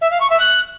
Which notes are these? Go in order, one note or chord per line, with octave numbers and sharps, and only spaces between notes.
E5
F5
C#6
E5
F#6